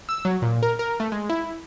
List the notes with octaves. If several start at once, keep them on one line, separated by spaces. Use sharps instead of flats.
E6
F#3
A#2
A#4
A#4
A3
G#3
E4